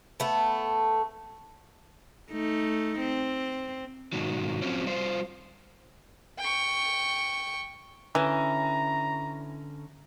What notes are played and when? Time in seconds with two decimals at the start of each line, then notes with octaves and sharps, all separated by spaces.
0.20 A3 B3
2.31 A3 D#4
2.99 C4
4.13 G#2 B2 D#3 F#3
4.62 F3 F#3 C4 C#4
4.86 G3 F4 C5
6.39 G5 C#6
8.15 D3 E3 C#4 A#5